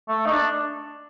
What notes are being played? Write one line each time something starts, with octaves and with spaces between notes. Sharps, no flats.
A3
D#4
D4